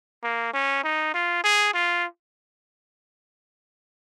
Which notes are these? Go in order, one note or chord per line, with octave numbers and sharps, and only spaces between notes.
A#3
C#4
D#4
F4
G#4
F4